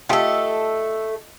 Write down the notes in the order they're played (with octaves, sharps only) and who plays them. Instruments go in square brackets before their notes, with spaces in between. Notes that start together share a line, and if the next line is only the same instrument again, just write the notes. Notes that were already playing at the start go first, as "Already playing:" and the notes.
[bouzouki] A3 A4 [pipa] F4 G4 D#5